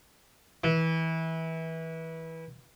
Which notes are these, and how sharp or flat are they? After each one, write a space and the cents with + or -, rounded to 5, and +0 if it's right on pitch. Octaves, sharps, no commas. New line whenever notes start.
E3 -20